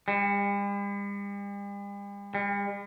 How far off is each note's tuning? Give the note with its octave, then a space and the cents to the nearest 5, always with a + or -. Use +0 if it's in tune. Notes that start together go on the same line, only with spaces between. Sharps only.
G3 +45
G3 +45